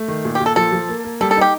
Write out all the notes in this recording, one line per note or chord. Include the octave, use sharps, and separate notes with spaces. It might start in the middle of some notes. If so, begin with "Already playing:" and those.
Already playing: A3
D#3
A#2
G4
A#2
A4
F3 A4
F3
A#3
A#3
G3 A4
A4
D#4 G4